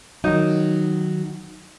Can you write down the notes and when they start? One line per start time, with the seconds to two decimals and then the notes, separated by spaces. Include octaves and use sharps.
0.24 D#3 F#3 D#4